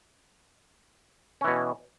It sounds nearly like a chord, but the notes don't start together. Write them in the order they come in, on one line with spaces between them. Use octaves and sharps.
C#4 E3 B2